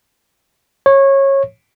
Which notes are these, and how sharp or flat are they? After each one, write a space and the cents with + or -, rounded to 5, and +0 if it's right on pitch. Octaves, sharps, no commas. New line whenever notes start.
C#5 -20